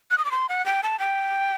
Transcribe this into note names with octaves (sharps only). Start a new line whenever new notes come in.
F#6
D#6
D6
C6
F#5
G5
A5
G5